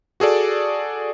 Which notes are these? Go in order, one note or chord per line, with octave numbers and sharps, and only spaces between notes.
F#4 G#4 A4 D5